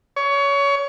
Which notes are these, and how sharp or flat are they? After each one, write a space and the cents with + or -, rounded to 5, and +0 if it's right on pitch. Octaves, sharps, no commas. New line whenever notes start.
C#5 +25